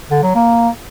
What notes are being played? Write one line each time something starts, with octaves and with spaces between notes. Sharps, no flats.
D3
F#3
A#3